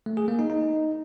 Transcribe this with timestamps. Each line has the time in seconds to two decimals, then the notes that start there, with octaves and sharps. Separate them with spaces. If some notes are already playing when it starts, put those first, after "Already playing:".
0.06 A3
0.17 G#4
0.28 A#3
0.39 D#4
0.50 D#4